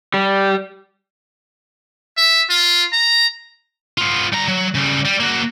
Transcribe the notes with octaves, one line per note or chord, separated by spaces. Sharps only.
G3
E5
F4
A#5
B3 F4
G3 A#5
F#3
C#3 G3
G3
A#3 F#4